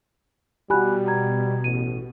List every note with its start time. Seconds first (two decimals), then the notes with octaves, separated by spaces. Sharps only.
0.70 B2 G3 F#4 G4 G#5 B5 F#6
1.08 A#5 G#6
1.64 A1 D#7